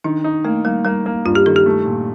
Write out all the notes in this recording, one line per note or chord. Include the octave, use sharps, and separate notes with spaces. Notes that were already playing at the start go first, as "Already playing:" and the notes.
D#3 D4
D#4
A3 A#3
G3 A#3
G3 A#3
A#3
G2 F4
G4
D#3 A4
G4
A3
A#2